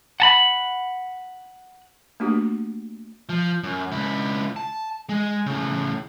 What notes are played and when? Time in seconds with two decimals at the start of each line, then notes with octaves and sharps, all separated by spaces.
0.20 F#5 A5 B5
2.20 A3 A#3 D4 F#4 G4
3.29 F3
3.64 F#2
3.92 C#2 E4
4.56 A5
5.09 G#3
5.46 A2 C#3